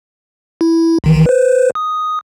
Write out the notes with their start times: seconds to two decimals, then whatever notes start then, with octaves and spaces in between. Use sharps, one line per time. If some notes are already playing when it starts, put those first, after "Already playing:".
0.61 E4
1.04 B1 D#3 E3
1.26 B4 C5
1.75 D#6